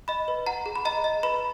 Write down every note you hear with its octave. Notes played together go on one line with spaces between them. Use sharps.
D#5 B5
B4
F#5 A#5
G#4
B5
D#5 A#5
D#5
B4 B5